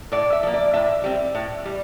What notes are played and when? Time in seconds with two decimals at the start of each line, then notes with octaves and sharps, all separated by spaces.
0.12 A2 D5
0.33 E5
0.43 F3 A#3
0.54 D5
0.73 A2 E5
1.04 G3 C4
1.35 A2
1.66 G3